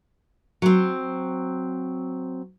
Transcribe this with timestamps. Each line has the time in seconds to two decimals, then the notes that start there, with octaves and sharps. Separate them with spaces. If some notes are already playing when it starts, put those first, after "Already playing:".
0.62 F#3 C4